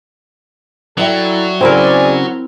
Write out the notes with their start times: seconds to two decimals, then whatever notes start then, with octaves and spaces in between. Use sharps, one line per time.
0.98 F#3 E4 A4 D5 E5 G5
1.61 C#3 C4 C#4 E4 G#4 A#4 D5 G#5